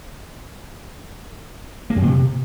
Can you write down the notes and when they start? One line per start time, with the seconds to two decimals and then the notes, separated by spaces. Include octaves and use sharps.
1.90 A#3
1.96 F#2
2.02 A#2
2.08 C3